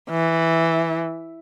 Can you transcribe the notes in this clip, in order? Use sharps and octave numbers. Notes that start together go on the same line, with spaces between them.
E3